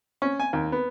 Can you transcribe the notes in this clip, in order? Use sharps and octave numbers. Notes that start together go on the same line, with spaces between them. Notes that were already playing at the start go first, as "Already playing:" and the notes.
C#4
G#5
D#2
B3